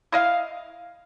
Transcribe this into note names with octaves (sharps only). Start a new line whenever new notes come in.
E4 D#5 F5